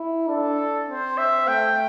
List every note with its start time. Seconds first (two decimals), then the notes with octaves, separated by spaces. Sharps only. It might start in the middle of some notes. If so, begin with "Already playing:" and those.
Already playing: E4
0.28 D4 A4
0.88 C4 C5
1.18 E5
1.48 A3 G5